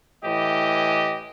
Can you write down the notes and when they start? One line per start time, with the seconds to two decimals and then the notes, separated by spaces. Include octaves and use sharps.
0.23 A2 E3 G4 D#5